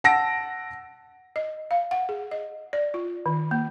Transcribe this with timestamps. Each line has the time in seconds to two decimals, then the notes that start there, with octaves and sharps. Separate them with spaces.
0.04 F#5 A5 E6 A#6 D7
1.36 D#5
1.71 F5
1.91 F#5
2.09 G#4
2.31 D#5
2.73 D5
2.94 F4
3.26 D#3
3.51 A#3